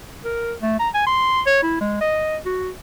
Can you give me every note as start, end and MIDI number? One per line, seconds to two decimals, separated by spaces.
0.25 0.53 70
0.62 0.76 57
0.79 0.89 82
0.94 1.02 80
1.07 1.41 84
1.46 1.62 73
1.63 1.78 64
1.81 1.98 56
2.01 2.37 75
2.46 2.70 66